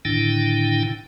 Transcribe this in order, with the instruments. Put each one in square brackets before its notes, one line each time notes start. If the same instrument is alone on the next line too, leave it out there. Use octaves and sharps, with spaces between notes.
[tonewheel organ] A2 D3 D#3 D4 E4 G5